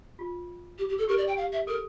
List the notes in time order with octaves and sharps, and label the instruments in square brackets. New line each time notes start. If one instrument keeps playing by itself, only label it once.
[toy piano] F4
[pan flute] G4
G4
A4
[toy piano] G4 [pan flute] A#4
[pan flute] D5
G5
F5
E5
[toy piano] A4 [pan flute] A#4